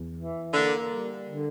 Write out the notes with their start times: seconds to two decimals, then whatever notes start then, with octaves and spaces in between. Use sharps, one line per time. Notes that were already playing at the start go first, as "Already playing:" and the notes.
Already playing: E2
0.16 E3
0.53 D3 A#3
0.90 G3
1.28 D3